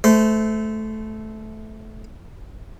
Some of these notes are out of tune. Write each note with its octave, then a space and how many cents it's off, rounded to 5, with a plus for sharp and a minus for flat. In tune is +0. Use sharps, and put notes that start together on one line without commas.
A3 -15 C5 -30